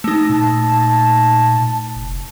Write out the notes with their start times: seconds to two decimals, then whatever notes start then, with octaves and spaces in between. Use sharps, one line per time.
0.04 A3 D#4
0.29 A#2 A5
1.96 F1